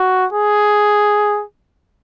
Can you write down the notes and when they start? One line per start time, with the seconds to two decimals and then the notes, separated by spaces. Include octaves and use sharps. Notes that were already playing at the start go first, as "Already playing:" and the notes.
Already playing: F#4
0.33 G#4